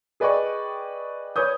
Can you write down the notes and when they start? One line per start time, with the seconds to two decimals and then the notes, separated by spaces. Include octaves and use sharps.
0.20 G#4 B4 D5 D#5 G5 C#6
1.36 B4 C#5 D#6 G6